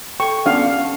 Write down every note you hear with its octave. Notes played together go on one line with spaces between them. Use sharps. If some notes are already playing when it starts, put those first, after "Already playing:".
A4 G5 C#6
B3 C#4 D4 F5 F#5